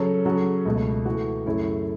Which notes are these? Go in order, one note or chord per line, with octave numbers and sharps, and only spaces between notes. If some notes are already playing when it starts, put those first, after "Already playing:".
Already playing: C#3 F#3 C#4 A4
C#3 F#3 C#4 F#4 A4
C#2 B2 A3
E3 A3 F#4 A4
F#2 C#3 A3 E4 A4